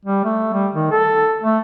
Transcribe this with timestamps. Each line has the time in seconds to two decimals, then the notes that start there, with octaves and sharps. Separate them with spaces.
0.05 G3
0.24 A3
0.53 G3
0.74 D#3
0.91 A4
1.42 A3